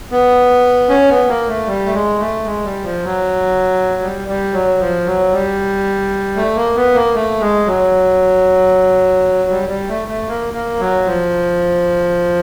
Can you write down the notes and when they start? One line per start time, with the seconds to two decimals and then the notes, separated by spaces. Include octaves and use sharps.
0.11 B3
0.89 C#4
1.09 B3
1.28 A#3
1.48 A3
1.67 G3
1.86 A3
1.94 G#3
2.20 A3
2.45 G#3
2.64 G3
2.84 F3
3.04 F#3
4.02 G3
4.28 G3
4.53 F#3
4.80 F3
5.06 F#3
5.33 G3
6.36 A3
6.56 A#3
6.76 B3
6.95 A#3
7.14 A3
7.41 G#3
7.67 F#3
9.50 G3
9.69 G3
9.89 A3
10.08 A3
10.28 A#3
10.54 A#3
10.80 F#3
11.06 F3